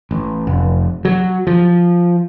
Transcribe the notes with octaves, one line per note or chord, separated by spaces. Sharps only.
A1
F1
F#3
F3